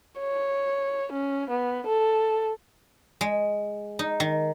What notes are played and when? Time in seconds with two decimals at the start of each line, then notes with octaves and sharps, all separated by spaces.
0.20 C#5
1.12 C#4
1.50 B3
1.86 A4
3.21 G#3
3.99 D#4
4.20 D#3